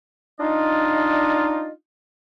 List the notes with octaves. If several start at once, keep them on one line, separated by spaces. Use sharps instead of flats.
D4 D#4 F4 D#5